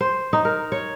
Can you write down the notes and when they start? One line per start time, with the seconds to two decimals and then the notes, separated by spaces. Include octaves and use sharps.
0.01 C5
0.33 D#4
0.45 A#4
0.72 C#5